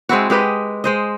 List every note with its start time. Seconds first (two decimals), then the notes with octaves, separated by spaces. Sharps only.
0.09 G#3 C4 E4 F#4
0.30 G#3 G4 B4 D#5
0.84 G#3 C5 D#5